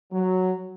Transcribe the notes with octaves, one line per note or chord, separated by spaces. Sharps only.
F#3